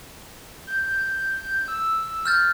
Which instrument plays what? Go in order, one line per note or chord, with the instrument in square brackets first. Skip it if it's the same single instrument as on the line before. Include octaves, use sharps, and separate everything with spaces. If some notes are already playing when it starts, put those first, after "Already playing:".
[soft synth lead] G6
E6
[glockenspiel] F6 G6 A6